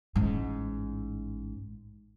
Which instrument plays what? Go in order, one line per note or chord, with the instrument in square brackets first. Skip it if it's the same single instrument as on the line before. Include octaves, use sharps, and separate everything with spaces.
[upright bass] A1 G#2